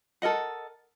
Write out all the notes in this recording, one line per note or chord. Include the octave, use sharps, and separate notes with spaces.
A4 A#4 D#5 F#5